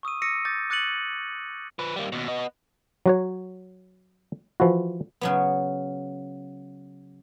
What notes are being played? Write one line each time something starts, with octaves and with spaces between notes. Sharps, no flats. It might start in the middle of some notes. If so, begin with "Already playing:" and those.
C#6 D#6 E6 D#7
D6 E6 A#6 C#7 D#7
D6 G6 A6
D6 F#6 A6 C#7 D#7 F#7
F3 B4
G3 A#3
D#2 B2
B3 D#5
F#3 F#4 C#5
E3 F3 E4 F#4
C#3 F#3 B3